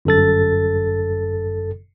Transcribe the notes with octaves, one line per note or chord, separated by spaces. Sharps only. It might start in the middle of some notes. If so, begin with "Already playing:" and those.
G1 F#2 A4 A6